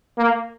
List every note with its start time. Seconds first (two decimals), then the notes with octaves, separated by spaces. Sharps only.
0.18 A#3